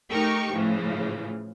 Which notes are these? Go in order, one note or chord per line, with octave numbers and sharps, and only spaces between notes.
A3 D#4 G4 A#4 G5 C#6
A2 C#3 E3 F3